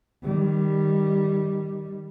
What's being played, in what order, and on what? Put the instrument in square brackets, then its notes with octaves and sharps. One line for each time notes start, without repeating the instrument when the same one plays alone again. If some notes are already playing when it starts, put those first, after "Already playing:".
[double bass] D#3 G3